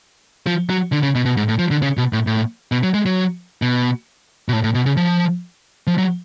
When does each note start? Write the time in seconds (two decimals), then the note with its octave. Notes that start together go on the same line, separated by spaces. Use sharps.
0.47 F3
0.70 F#3
0.92 D3
1.03 C#3
1.15 B2
1.25 B2
1.37 G#2
1.48 A2
1.59 F3
1.71 D3
1.82 C#3
1.97 B2
2.13 A2
2.27 A2
2.72 B2
2.83 F#3
2.94 G#3
3.06 F#3
3.62 B2
4.48 B2
4.53 A2
4.64 A2
4.75 B2
4.86 C#3
4.97 F3
5.87 F3
5.98 F#3